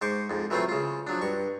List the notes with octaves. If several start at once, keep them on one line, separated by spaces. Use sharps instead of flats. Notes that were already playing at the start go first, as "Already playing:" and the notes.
G#2 C5 C#6 D6
F2 G#2
E3 F#3 A3 C4 E4 F4
C#3 F4
F3 F#3 D4
G2 C#6